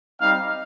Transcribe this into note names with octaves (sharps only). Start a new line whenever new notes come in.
G3 C4 D#4 F5